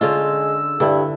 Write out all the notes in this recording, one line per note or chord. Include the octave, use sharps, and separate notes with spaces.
D3 G#3 C#4 F4 E6
G2 D3 E4